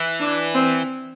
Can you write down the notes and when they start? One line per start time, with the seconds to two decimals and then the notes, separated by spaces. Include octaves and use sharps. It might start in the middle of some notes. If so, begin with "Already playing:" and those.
Already playing: E3
0.20 D4
0.55 C4